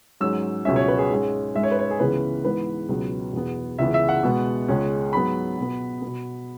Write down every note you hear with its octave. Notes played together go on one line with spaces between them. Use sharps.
G#2 F#3 C#4 E6
C#2 B2 F#3 C#4 E5
C#5
B4
G#4
G#2 G#3 C#4
G#2 G#3 C#4 E5
C#5
B4
C#5
G#4
C#2 C#3 E3 B3 B4
G#2 E3 G#3 B3 B4
C#2 B2 F#3 B3
E2 B2 B3
C#2 C#3 E3 B3 E5
E5
F#5
B2 G#3 B3
C#2 C#3 G#3 C#4
G#2 F#3 B3 B5
B2 B3
B2 B3